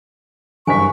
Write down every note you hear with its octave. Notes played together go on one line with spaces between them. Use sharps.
F#1 G2 C5 G#5 C#6 B6